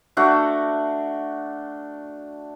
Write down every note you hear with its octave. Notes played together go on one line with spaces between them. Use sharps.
A3 D4 F#4